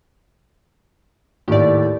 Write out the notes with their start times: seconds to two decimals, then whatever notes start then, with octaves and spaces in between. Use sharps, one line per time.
1.48 D#2 A2 G4 D5